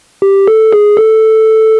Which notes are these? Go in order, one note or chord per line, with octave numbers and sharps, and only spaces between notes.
G4
A4
G#4
A4